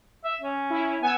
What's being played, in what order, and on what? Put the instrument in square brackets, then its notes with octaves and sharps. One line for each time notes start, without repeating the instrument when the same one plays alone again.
[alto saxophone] E5
C#4
[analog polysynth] E4
[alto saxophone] B3 [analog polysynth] G#5 E6